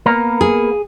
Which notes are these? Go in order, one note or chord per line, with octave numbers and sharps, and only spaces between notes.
A#3 B3 A#4
G#4